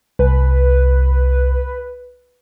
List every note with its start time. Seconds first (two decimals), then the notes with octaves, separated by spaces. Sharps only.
0.19 C2 B4